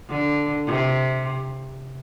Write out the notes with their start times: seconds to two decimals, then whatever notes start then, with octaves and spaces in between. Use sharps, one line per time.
0.09 D3
0.66 C3